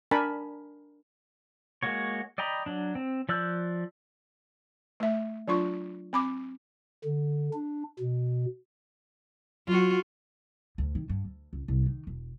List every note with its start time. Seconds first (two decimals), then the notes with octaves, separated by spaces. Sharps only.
0.11 D4 A#4 G#5 A5 B5
1.83 G#3 A#3 F#4 C#5
2.38 D5 D#5 G5 A#5 B5
2.66 F#3 D4
2.95 C4
3.29 F3 D5 E6 F#6 G6
5.00 A3 E5
5.48 F#3 D4 F4 C#6
6.13 C4 B5 D6
7.04 D3
7.54 D4
8.00 B2
9.67 F#3 F4 F#4
10.78 D2
10.95 D#3
11.09 G2
11.25 D2
11.53 C#2
11.68 C2
11.86 D#3
12.07 E1